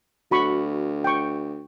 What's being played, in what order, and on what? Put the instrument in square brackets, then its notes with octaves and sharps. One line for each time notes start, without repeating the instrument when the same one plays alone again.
[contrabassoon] D2 [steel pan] F#4 B5 C#6
[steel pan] G5 C#6